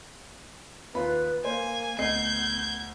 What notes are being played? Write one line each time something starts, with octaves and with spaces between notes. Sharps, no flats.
D#2 F4 B4 B5
A#3 C5 G#5
D2 B3 D#5 G6 G#6 C7